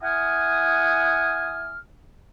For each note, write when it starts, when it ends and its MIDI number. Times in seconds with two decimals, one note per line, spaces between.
0.02 1.77 64
0.02 1.77 78
0.02 1.77 80
0.02 1.77 87
0.02 1.77 89